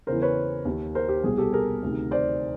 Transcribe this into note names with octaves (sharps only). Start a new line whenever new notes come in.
E2 C#3 E3 A#4 C5
B4 C#5
D#2 D#3
A#4 C5
G4
C2 B2 G#4
G4 A4
G#4 A#4
D2 C3 D#3
C5 D5